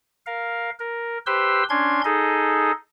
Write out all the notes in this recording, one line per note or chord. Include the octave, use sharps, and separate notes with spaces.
A#4 F5
A#4
G4 B4 C5 C6 E6
C#4 D4 C6 G#6
D#4 G#4 A4 D#5